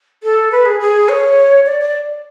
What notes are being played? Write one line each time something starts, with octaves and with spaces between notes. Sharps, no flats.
A4
B4
G#4
G#4
C#5
D5
D5